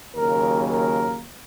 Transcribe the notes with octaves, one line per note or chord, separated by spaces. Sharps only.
D#2 C#3 F#3 A#3 A#4
A#4